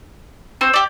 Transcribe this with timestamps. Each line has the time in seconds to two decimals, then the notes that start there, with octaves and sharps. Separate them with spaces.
0.61 C4 F#4 C5 E6
0.74 G4 D5